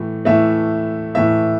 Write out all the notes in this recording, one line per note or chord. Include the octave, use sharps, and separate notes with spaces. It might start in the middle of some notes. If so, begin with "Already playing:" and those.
Already playing: A2 E3 A3
A2 E3 A3 E5
A2 E3 A3 E5